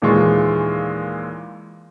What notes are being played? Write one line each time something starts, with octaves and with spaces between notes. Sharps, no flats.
D#2 A#2 E3 G#3 F4 C#6